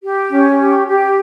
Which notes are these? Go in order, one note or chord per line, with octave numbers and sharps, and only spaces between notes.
G4
C#4
G4
G4